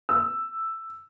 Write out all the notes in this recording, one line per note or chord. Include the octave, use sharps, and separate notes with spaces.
E6